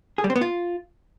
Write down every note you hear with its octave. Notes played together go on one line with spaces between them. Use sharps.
G#4
G3
C4
B3
F4